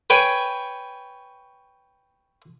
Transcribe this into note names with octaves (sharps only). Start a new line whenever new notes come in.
B4 C#5 G5 G#5 C#6